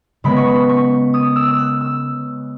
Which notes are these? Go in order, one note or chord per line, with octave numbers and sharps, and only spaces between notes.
C#3 G#3 B3 B5
C#6
B5
C#6
D#6
E6
E6
F#6
E6